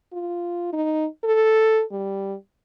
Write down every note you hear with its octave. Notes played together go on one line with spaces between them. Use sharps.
F4
D#4
A4
G3